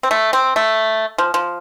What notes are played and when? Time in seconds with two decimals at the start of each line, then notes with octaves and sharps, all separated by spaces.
0.03 C4
0.11 A3
0.33 C4
0.56 A3
1.18 F3
1.34 F3